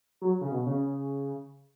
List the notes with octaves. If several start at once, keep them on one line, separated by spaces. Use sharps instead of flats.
F#3
C#3
B2
C#3